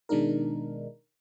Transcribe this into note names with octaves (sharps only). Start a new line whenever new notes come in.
B2 D#3 G#3 D4 D#4 A#4